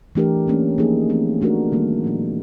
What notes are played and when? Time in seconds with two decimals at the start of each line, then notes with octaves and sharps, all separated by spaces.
0.15 E3 A3 D4 G4 A#4
0.47 F#3 A#3 C#4
0.78 F3 A#3 D#4 G#4
1.09 E3 A3 C4
1.41 E3 A3 D4 F#4 A#4
1.72 D#3 G3 A#3
2.03 A#2 F3 A#3 D#4